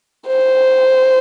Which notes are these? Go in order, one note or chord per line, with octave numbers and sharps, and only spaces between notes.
C5